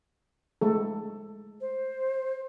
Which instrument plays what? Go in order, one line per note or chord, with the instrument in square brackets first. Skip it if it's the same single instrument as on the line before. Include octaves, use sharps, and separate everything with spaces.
[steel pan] G#3 A3 A4
[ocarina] C5